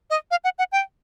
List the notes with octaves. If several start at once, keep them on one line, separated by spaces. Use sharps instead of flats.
D#5
F5
F#5
F#5
G5